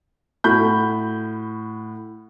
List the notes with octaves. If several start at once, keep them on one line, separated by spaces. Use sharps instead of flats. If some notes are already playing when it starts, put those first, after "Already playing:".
A2 F#4 B5 G6